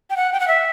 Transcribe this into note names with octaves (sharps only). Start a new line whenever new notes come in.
G5
F#5
G5
F#5
E5